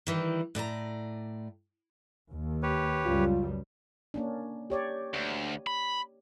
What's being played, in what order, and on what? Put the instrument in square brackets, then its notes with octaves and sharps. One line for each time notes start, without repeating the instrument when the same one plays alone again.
[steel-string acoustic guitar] D#3 E3 G3
A2 D5 A5 A#5
[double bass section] D#2
[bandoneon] G4 B4 C#5
[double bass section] C#2 F#2 G3 [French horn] F4
[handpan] A#3 C#4 D4
G4 C#5 D5
[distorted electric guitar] D2
B5